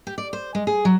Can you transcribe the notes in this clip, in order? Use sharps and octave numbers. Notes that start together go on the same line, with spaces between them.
G4
D5
C5
G#3
G#4
F#3